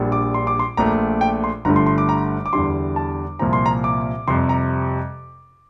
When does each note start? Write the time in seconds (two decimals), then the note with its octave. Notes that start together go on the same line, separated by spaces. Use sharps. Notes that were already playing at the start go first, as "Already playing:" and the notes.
Already playing: A#1 A#2 G3 D4
0.12 D6
0.34 C6
0.47 D6
0.59 C6
0.77 A#1 A#2 A3 A#5
1.21 G5
1.44 C6
1.65 G1 G2 D3 A3 A#5
1.76 C6
1.86 C6
1.98 D6
2.09 A#5
2.46 D6
2.53 E2 D3 G3 C6
2.96 A5
3.39 C2 A#2 F3 C4 A#5
3.53 C6
3.66 A#5
3.84 D6
4.28 F2 C3 G3 C6
4.49 A#5